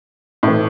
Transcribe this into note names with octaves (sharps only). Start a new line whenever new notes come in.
A2 E3